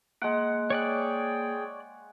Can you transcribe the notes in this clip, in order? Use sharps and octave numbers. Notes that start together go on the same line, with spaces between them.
G#3 A#3 F#5
G#4 C#5 D5 G5 F#6